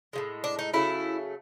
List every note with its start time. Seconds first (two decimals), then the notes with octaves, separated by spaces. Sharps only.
0.13 A2 F3 G#3
0.44 D4
0.59 D#4
0.73 C#3 F#3 A3 E4